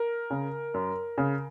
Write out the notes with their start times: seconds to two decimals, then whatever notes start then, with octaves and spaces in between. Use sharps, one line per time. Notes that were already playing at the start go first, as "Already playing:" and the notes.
Already playing: A#4
0.30 C#3
0.74 F#2
1.18 C#3